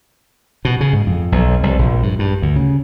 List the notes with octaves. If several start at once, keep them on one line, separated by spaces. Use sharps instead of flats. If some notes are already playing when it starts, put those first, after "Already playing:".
B2
C#3
G#2
F2
B1
C2
A#1
G2
G2
D2
C#3